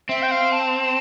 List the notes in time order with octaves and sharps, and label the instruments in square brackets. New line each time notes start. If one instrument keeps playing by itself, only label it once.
[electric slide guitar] C4 [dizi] E5
[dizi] G5
F5
A5